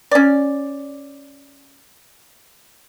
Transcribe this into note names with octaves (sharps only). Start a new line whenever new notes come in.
C#4 D5